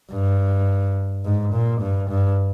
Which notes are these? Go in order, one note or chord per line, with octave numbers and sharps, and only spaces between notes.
G2
G#2
A#2
G2
G2